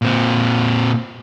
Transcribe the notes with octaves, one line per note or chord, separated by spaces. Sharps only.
A#2 C4